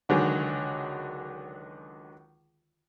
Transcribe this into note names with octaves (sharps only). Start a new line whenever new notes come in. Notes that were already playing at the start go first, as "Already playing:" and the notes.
C#2 D3 D#3 F#3 G#3